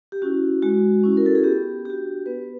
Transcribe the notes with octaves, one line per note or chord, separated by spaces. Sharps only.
G4
C#4 E4 F#4
G#3 F#4
C#4 E4
A#4
A4
G#4
B3 G4
D4 F#4 G4
B3 B4